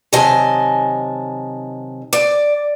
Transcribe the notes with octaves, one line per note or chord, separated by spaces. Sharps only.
C3 D#3 F#3 D#5 G#5 A5
D5